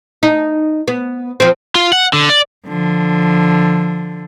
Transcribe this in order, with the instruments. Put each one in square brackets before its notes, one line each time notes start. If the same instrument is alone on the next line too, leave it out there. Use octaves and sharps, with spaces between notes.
[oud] D#4
B3
F3 C4
[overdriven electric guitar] F4
F#5
D3
D5
[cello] D3 F3